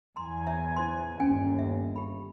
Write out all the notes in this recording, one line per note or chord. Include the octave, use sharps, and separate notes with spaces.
E2 G#5 A#5 C6
C#5 E5 A#5
E4 C5 C6
G1 D#2 C#4 G5 G#5
E5
G4 B5